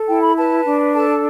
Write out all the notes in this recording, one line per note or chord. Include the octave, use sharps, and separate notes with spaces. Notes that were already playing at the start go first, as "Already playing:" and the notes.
Already playing: A4
E4 G5
B5
B4 A5
D4
A4 A5